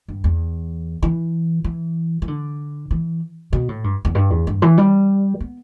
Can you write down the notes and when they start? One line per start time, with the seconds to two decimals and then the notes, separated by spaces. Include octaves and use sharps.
0.08 G2
0.24 E2
1.03 E3
1.64 E3
2.22 E3
2.28 D3
2.91 E3
3.53 B2
3.69 A2
3.84 G2
4.05 E2
4.15 G2
4.30 E2
4.47 G2
4.62 E3
4.78 G3
5.40 B3